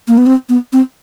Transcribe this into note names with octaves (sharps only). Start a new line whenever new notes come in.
A#3
B3
C4
B3
C4